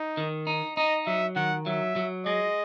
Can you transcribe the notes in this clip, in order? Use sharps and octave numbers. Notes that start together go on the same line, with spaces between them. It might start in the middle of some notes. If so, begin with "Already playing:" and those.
Already playing: D#4
D#3
D#4
D#4 D#5
F#3 E5
D#3 F#5
F#3 E5
F#3
G#3 D#5